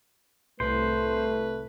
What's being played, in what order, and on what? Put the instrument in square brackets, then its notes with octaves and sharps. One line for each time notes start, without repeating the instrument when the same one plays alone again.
[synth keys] C2 A2 [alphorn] A3 [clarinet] B4 [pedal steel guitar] C5